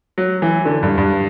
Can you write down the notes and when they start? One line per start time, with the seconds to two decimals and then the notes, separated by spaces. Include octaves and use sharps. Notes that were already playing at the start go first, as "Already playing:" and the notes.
0.18 F#3
0.42 E3
0.65 D3
0.83 G2
0.98 G2